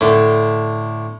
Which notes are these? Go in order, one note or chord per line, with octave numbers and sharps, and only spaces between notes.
A2 D3